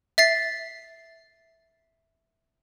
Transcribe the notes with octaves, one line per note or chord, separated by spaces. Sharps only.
E5 A6 C7